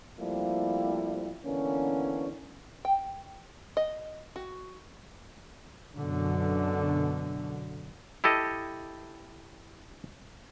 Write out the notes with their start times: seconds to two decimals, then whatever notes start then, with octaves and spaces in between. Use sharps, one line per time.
0.19 F3 G3 A3 A#3 C4 E4
1.44 D3 E3 A#3 B3 C#4
2.85 G5
3.77 D#5
4.36 F#4
5.98 F#2 B2 D3
8.24 E4 G4 A4 D#5